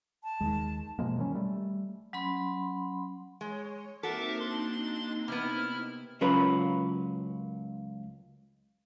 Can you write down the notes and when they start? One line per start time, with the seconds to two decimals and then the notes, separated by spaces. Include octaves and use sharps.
0.24 A5
0.41 D#2 D#3 G#3
0.99 B2 F3 G#3 A#3
1.18 D#3 F#3 G3 C#4
1.35 G3 A3
2.13 F#3 C#4 B5 C6
3.41 G#3 C#5
4.03 A#3 C4 D#4 F#4 A4 A#4 E5 D6
4.39 D4 C6
5.28 C3 B3 E4 F6
6.21 C#2 F#3 C#4 F4 A#4 B4